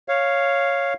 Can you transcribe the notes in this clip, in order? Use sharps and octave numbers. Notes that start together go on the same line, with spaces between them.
C#5 F5